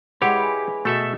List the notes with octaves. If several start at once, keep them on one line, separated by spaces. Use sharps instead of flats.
G#3 E4 G4 B4 C#5 F#5 D6
G#5
B2 A3 A4 E5